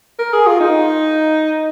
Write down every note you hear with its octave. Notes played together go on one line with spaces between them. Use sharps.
A#4
G#4
F4
D#4